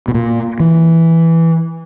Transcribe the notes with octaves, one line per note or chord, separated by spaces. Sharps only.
B2
A#2
E3